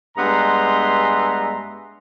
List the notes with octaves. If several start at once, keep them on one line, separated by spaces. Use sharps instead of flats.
G2 G#3 B3 E5 A#5 C6